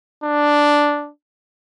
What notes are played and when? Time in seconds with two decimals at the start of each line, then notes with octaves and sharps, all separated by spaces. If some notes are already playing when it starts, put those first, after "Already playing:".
0.24 D4